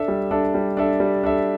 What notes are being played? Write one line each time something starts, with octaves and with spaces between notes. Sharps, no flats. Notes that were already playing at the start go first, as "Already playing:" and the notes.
Already playing: D4 A4 E5
G3
D4 A4 E5
G3
D4 A4 E5
G3
D4 A4 E5